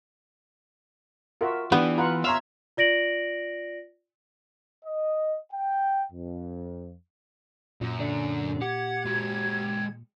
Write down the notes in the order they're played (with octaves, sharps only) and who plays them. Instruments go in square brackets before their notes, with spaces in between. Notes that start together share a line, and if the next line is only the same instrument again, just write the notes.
[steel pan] F4 F#4 E5 [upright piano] A#4
[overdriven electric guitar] E3 [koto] B3 [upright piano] D4 [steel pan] G4
[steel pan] F4 B4 F#5 [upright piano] A#5
[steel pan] C#5 F5 [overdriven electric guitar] E5 [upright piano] A#5 C6 F7
[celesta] F4 D5 A#6 D7 F#7
[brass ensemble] D#5
G5
F2
[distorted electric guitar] F#2 [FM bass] A#2
[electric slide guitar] D3 D5
[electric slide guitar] G4 [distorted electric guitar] F#5 [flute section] G#6
[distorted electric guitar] G#3 F#4